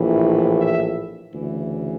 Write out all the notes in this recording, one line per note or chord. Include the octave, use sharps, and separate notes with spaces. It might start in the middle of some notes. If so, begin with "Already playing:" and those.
Already playing: A#1 A2 E3
E5
D2 C#3 E3